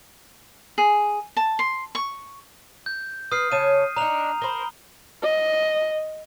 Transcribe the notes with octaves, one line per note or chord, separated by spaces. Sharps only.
G#4
A5
C6
C#6
G6
B4 D#6 F6 C7
C#3 C#5 A5 D#7
D4 D#4 A#5 F7
A#4 C5 B5 G7
D#5